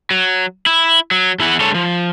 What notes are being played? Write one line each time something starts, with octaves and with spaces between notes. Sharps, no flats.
F#3
E4
F#3
E2 E4 G#4 F#5
D3 G#3 A4 C#5
F3